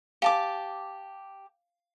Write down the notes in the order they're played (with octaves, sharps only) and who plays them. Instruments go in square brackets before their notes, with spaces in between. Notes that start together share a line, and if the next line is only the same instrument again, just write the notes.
[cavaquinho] G4 A5 D6 [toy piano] F5 G#5